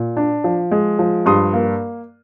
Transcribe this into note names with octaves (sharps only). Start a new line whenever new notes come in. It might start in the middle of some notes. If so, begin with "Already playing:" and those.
Already playing: A#2
D4
F3
G#3
F3
G2 C6 D#6
A#3